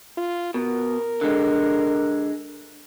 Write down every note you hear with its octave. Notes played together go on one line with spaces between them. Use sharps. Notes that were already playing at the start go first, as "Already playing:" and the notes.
F4
B2 A#4
D3 G#3